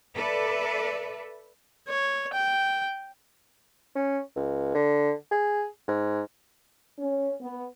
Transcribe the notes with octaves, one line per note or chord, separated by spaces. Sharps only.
A4 B4 D5 E5
C#5
G5
C#4
C#2
D3
G#4
G#2
C#4
B3